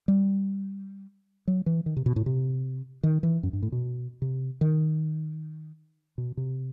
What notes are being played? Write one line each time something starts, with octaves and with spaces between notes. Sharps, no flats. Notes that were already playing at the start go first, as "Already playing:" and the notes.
G3
F#3
E3
D#3
C3
B2
A2
C3
D#3
E3
F#2
G2
A2
B2
C3
D#3
B2
C3